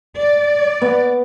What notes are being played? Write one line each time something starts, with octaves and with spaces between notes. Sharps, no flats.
D5
B3